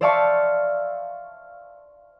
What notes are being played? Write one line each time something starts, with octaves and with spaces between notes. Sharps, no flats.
C5 D5 E5 F5 A5 C#6